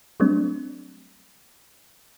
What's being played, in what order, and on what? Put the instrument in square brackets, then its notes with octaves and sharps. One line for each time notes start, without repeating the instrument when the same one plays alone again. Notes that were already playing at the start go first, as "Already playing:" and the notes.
[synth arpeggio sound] F#3 G3 A3 C4 D4